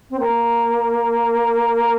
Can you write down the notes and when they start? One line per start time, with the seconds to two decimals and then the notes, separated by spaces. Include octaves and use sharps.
0.10 C4
0.19 A#3